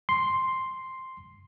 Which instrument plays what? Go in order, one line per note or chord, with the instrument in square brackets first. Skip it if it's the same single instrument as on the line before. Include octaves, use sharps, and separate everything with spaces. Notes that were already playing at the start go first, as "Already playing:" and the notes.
[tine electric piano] C6